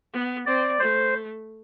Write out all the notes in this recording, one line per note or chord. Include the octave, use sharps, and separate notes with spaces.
B3
C4 D5
A3 C5